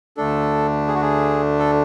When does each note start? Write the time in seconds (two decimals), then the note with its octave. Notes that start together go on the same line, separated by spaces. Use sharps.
0.17 D2 D3 A3 D4 A4
0.88 G#4
0.95 F#4
1.02 G#4
1.59 A4